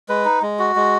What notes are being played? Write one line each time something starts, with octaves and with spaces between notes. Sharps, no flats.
G#3 B4
D#4
G#3
F#4
G#3